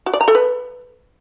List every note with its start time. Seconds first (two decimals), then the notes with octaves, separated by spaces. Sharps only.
0.06 F#4
0.13 D5
0.21 A#5
0.28 A4
0.35 B4